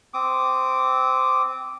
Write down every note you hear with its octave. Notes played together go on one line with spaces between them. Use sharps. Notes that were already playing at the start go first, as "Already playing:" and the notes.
C4 D6 D#6